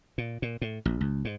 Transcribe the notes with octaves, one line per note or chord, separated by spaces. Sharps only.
A#2
A#2
A2
A#1
C#2
G#2